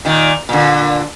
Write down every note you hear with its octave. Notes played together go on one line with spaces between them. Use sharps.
A#2 D#3
A#2 D3